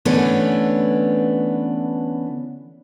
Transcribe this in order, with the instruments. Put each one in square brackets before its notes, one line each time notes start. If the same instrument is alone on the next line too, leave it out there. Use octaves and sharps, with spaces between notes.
[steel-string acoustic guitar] D3 E3 A3 B3 C#4 D4